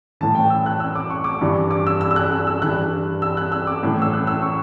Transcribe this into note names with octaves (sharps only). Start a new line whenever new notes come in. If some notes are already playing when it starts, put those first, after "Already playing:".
A2 E3 A5
G5
E6
F#6
E6
D6
C#6
D6
G2 E3 C#6
D6
E6
E6
E6
F#6
E6
E6
G2 E3 F#6
E6
F#6
E6
D6
A2 E3
E6
F#6
E6
C#6